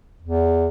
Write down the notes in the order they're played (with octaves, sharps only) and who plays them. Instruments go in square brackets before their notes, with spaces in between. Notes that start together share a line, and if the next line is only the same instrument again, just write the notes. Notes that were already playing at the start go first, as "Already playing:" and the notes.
[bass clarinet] E2